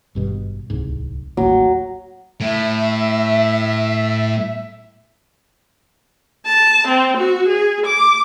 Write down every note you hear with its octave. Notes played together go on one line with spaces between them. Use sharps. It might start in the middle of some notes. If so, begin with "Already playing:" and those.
G#1 G2 B2
D1 C2 G#2
D#1 A1 F#3 A#3
A2 E5
A5
C4
F#4
G#4
D6